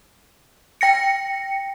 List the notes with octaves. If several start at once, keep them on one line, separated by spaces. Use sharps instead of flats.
G5 A#6 C#7